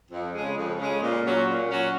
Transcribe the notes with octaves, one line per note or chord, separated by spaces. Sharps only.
F2
C#3 G#3
F2
C#3 G#3
A#2
F#3 C#4 F#4
A#2
F#3 C#4 F#4